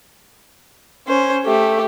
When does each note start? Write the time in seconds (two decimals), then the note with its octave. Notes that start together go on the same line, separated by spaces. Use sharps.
1.07 C#4 C5
1.45 A3 G4